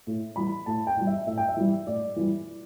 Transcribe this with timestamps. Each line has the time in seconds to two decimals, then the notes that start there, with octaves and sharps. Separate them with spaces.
0.07 A2
0.36 E3 G3 B5
0.66 A2 A5
0.87 G5
0.97 E3 G3
1.07 E5
1.26 A2 E5
1.37 G5
1.49 E5
1.57 E3 G3
1.87 A2 D5
2.16 E3 G3